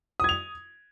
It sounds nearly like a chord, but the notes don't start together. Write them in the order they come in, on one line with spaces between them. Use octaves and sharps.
D#6 G#6 F7